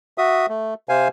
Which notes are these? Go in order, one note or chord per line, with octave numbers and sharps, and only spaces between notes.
F#4 E5 D#6
A3
C3 C5 F5 G#5